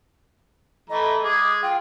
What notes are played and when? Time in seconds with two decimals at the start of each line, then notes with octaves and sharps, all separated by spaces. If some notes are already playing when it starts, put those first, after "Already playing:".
0.90 E3 A3 D#5 A#5
1.23 G#3 G#4 D6
1.62 F4 G5